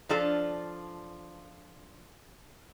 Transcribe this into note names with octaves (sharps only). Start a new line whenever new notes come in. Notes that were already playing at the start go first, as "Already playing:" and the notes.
F3 D4 F4 A4